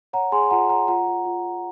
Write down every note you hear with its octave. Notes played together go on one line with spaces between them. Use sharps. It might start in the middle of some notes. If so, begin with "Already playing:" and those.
C#5 F#5 A#5
G#4 G#5 C6
F4 F#5 A#5
C#5 F#5 A#5
F4 F#5 A#5
F4
F4
F4